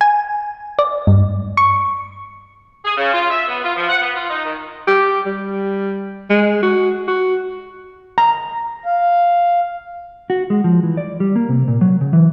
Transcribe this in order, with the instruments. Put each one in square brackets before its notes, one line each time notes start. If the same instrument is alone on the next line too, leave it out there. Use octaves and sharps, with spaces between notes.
[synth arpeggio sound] G#5
D5
G2
C#6
[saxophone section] G#4
C#3
F4
E5
B3
F4
F3
F#5
B3
F4
D#4
D#3
[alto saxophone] G4
G3
G#3
F#4
F#4
[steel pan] A#5
[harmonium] F5
[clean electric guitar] F#4
G#3
F3
E3
D5
G3
A#3
C3
A#2
F#3
C#3
E3